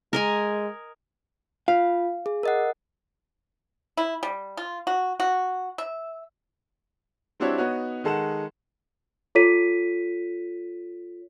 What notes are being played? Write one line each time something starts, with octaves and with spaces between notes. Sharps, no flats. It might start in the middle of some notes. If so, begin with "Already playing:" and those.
G#3 A#4 D#5 G#5
F4 F5
G#4
A#4 D#5 F#5
E4
G3
F4
F#4
F#4
E5
G3 C4 D4 E4 F#4 C#5
B3 D#4 F#4 C#5
D#3 G#3 A4 F#5 E7
F4 A4 C#5 B6 D#7